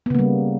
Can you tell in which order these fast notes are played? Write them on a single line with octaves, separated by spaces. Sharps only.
B3 C#3 A#3 G3